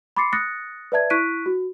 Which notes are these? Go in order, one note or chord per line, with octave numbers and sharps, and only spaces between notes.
B5 C6 D6 A6 C7 C#7
D#6 F#6 A6 A#6 C#7
B4 D5 E5 A5 G#6
E4 C#6 F#6 B6 D7 D#7
F#4